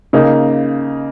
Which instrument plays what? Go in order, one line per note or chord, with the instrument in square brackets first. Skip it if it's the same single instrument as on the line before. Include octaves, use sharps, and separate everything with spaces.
[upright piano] C#3 A#3 D#4